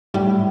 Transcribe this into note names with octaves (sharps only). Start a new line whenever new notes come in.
A2 G3